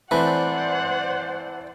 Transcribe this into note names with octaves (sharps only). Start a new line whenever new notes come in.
E3 A3 C4 B4 C5 D5 F#5